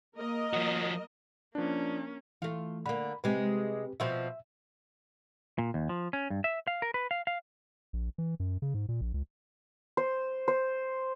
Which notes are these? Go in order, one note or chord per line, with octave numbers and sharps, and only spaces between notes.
A#3 A#4 D#5
F3 F#4
F3 A#3 C#4 D4
E3 A3 F4
D3 A#3 B5
C3 G#3 C4 G4 B4
B2 F3 C4 E5
A#2
D#2
F3
C#4
G2
E5
F5
A#4
B4
F5
F5
A#1
E3
F#2
C#3
G#2
A#2
A#1
C#2
C5
C5